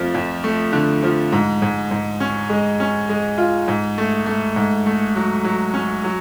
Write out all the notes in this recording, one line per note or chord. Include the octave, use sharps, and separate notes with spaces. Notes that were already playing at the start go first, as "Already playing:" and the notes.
Already playing: F2 F3 A3
F2
A3
D3
F3
G#2
G#2
G#2
C#4
G#3
C#4
G#3
F4
G#2
A3
A3
G#2
A3
F#3
F#3
C#4
F#3